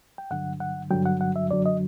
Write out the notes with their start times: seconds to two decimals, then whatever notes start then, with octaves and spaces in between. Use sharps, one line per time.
0.18 G5
0.31 G2 D3 F#3 F#5
0.60 F#5
0.91 G2 D3 F#3 G5
1.05 F#5
1.21 F#5
1.36 E5
1.50 F#2 D3 F#3 D5
1.66 D#5